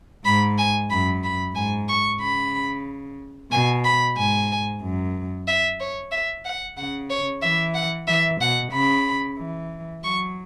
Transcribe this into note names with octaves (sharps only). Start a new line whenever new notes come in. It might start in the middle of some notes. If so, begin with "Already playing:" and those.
G#2 B5
G#5
F#2 B5
B5
G#2 G#5
C#6
C#3 B5
B2 G#5
B5
G#2 G#5
F#2
E5
C#5
E5
F#5
C#3 F#5
C#5
E3 E5
F#5
E3 E5
B2 F#5
C#3 B5
E3
F#3 C#6